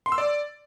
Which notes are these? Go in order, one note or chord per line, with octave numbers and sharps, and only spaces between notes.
C6
E6
D5